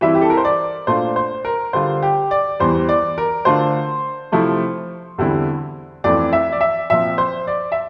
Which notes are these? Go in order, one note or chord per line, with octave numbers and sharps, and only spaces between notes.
E3 G3 C4 E4 E5
G4
A4
A#4
C5
D5
A#2 A3 D4 F4 C5
C5
A#4
D3 G3 D4 F4 C5
G4
D5
E2 E3 G3 C5
D5
A#4
D3 A3 D4 F4 C5
C3 F3 A3 E4
E2 D3 G3 C4 E4
F2 E3 A3 C4 D5
E5
D5
E5
A#2 F3 C4 E5
C5
D5
E5